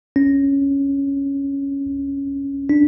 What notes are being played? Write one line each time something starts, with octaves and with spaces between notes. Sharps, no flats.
C#4
D4